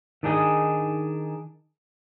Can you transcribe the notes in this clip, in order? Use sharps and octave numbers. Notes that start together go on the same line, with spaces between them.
D#3 D4 D#4 G#4 D#5